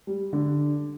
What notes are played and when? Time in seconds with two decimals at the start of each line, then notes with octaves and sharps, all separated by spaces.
0.07 G3
0.33 D3